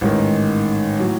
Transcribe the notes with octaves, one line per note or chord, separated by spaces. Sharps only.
A1 G#2 D#3
A2 F#3